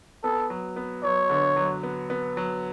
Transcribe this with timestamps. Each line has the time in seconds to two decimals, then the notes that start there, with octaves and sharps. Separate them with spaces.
0.23 B3 A4
0.50 F#3
0.76 B3
1.04 F#3 C#5
1.30 D3
1.57 F#3
1.83 B3
2.10 B3
2.37 F#3